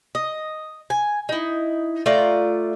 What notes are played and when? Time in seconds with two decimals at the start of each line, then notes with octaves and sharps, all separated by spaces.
0.15 D#5
0.90 G#5
1.29 D#4 E4
2.06 A3 F4 D5 A#5